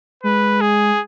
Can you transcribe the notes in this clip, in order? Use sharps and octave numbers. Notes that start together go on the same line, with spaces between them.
G#3 B4
G#4